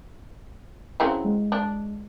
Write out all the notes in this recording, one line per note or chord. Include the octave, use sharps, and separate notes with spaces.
C#3 F#3 C4 E4
G#3
D4